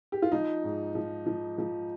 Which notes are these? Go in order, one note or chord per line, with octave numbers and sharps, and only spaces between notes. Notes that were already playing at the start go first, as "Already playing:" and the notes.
G4
F4
F3 D#4
G#2
F3
F3
F3